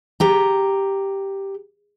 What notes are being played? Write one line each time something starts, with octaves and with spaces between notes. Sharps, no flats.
G4 A#5